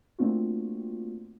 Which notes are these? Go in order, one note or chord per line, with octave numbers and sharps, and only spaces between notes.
A3 A#3 C4 D4 F4 F#4